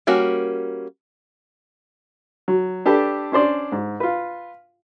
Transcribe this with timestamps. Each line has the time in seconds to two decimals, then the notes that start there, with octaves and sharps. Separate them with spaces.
0.07 G3 A#3 C#4 F#4
2.48 F#3
2.86 D4 G4 A4 B4
3.32 C#4 D4 C5 D5
3.72 G#2
4.00 F4 B4